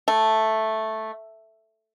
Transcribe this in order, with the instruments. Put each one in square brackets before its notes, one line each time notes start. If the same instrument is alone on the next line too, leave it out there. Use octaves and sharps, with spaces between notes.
[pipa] A3